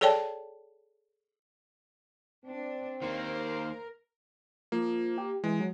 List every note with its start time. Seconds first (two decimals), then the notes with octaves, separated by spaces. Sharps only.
0.01 G#4 A4 C#5 D5 G5 A5
2.45 C4 D4
3.02 D#3 A#3 A#4 C5 F5
4.72 F3 A#3
5.18 G4
5.44 E3 G#3
5.60 F#3